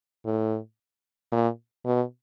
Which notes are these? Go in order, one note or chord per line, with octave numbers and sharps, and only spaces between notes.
A2
A#2
B2